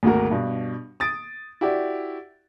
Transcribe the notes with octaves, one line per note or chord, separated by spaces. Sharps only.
G#1 D2 A#3 F#4 A#4
G2 B2
D#6 A6 D7
E4 F#4 G4 D5